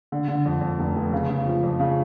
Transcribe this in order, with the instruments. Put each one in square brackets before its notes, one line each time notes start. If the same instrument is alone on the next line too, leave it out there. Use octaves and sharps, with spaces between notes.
[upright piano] D3
D3
F2
F2
F1
F1
C#3
C#3
F3
F2
C#3